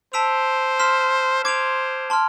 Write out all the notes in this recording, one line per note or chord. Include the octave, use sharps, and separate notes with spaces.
C5 A5 E6 B6 D7 F7
C6 F6 B6 E7
C5 D6 G#6 D7 F7
A5 C6 F6